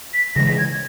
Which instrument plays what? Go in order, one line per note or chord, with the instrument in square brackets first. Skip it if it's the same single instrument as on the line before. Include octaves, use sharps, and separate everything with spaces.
[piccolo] B6
[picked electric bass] C#3 E3 G#3 [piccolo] A#6
[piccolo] G#6